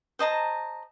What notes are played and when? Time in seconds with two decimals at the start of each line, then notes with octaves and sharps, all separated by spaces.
0.19 C5 D#5 A5 A#5